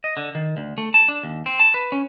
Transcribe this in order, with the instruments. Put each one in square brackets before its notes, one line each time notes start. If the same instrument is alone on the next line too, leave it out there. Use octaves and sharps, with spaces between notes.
[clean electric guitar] D#5
D3
D#3
D2
A3
A5
D4
D#2
C4
A5
B4
C#4